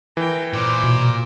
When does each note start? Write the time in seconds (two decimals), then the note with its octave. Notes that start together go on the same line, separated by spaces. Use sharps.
0.17 E3 A#4 G5
0.53 A#2 C5 D6
0.84 B2